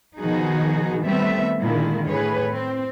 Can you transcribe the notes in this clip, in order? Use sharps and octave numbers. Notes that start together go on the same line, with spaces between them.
B2 D#3 F3 D#4 F#4 G#4
D#3 G3 A3 B3 C4 E5
A#2 D3 D#3 G#3 E4
A2 G#4 B4 C#5
C4